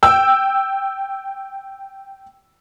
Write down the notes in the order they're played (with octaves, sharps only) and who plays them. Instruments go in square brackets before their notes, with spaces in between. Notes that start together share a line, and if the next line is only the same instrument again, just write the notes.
[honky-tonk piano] G5 E6